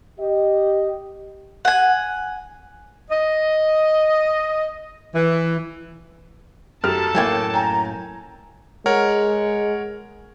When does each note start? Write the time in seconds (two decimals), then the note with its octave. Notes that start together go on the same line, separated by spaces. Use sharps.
0.20 G4 D#5
1.65 F#5 G#5
3.11 D#5
5.15 E3
6.84 F#2 G4 A4 A5 F6
7.15 F#2 A2 A#3 G5 G#5 G#6
7.54 G5 G#5 A#5
8.86 G#3 A#4 C#5 F#5